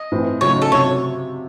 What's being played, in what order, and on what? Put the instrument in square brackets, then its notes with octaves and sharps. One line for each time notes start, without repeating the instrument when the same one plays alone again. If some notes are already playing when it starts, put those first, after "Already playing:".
Already playing: [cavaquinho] D#5
[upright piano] A2 E3 C4
[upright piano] C#3 F#3 A3 D#4 [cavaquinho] C#5
[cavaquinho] A4
[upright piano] C3 F#3 [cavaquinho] C#5